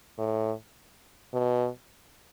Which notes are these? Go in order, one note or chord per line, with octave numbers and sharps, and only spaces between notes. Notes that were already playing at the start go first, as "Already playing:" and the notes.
A2
B2